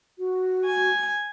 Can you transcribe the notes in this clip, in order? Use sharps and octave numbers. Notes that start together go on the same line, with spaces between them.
F#4
G#5